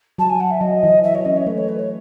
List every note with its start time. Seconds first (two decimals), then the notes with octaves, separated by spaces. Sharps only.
0.18 F#3 A5
0.29 G#5
0.40 F#5
0.51 E5
0.61 F#3 D#5
0.83 E3
1.04 F#3 E5
1.15 C#5
1.25 C#4 D#5
1.37 C#5
1.47 A3 B4
1.58 C#5
1.68 B4
1.79 C#5